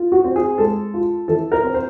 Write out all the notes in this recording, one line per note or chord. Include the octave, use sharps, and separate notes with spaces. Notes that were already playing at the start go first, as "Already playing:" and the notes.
Already playing: F4
F#4
C4
G#4
G#3 A4
F4
E3 A4
A#4
C4
C5